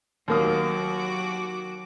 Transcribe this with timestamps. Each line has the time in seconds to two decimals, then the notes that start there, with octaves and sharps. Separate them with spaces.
0.28 D#2 F#3 A#3 F#4 D6 D#6